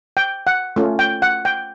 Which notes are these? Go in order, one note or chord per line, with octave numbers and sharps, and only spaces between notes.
G5
F#5
A3 C#4 F4
G5
F#5
G5